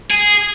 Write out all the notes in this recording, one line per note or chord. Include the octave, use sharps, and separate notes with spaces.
G#4